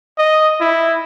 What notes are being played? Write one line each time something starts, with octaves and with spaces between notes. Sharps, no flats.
D#5
E4